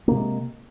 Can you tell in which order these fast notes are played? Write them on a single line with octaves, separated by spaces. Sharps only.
A#3 C3 G#3